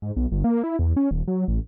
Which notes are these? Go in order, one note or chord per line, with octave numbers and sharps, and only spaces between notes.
G#2
B1
G1
A#3
E4
E2
C#4
D#1
F#3
A1